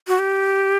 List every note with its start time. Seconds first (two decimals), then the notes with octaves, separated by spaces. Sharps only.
0.08 F#4
0.19 G4